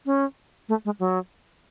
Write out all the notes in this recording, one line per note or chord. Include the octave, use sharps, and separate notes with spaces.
C#4
A3
G#3
F#3